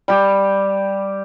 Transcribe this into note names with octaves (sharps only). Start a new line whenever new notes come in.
G3 G4